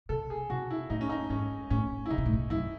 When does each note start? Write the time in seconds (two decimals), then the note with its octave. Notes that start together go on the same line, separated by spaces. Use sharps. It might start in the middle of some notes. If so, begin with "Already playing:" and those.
0.09 C3 A4
0.30 G#4
0.50 C3 F#4
0.70 E4
0.90 A2 D#4
1.01 C#4
1.09 D#4
1.30 G#2 C#4
1.70 A2 C#4
2.06 E4
2.10 C#3 D#4
2.18 C3
2.26 A2
2.33 C3
2.50 F#2 E4